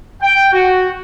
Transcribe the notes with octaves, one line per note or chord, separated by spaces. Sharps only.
G5
F#4